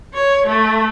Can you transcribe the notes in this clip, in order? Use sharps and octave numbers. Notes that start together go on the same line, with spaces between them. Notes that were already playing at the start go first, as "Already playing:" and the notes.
C#5
A3